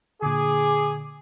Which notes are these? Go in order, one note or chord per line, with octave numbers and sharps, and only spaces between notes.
A#2 D3 G#4 D6